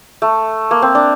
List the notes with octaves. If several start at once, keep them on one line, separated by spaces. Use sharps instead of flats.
A3
A#3
C4
D4